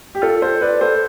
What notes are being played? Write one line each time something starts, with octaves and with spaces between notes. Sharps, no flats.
G4
F4 A4
A4 C5
B4 D5
A4 C5